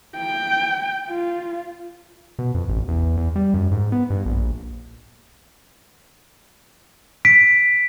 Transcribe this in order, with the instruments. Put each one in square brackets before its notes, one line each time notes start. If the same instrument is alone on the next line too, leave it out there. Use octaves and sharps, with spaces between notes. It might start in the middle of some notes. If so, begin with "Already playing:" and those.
[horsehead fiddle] G5
F4
[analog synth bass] B2
F2
A1
E2
E2
G3
F#2
G#2
B3
G2
A#1
[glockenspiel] B6 D7